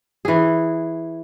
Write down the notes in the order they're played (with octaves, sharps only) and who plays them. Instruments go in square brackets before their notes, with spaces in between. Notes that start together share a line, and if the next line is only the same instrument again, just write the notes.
[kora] E3 G#4